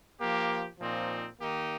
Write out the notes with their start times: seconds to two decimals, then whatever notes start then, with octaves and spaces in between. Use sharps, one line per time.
0.20 F3 A#3 G4
0.80 A#2 F3 C4 D#4
1.40 D#3 A#3 D#4 G4